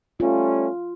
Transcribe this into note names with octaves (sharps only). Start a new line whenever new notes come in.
G3 A3 C#4 F4